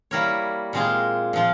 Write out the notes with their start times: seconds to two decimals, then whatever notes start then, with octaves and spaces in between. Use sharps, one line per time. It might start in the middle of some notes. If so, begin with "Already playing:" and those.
0.11 G3 A#3 E4 A#4 C#5
0.73 A#2 G#3 C4 F4 G#4
1.33 A#2 F3 C4 F4